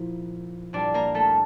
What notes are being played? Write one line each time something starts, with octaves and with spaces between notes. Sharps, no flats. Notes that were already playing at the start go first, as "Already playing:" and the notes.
Already playing: A#2 F3 E4
A#2 G3 D4 D5
A#3 A#4
A3 A4